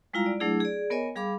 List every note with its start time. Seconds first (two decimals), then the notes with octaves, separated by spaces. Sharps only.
0.13 G3 G#3 E4 F4 F5 A#5
0.26 D5
0.40 F#3 A3 D4 E4 G#4
0.60 G#4 D5
0.90 B3 A#4 C#5 D#5 G#5
1.16 G3 G#4 F5 B5 D6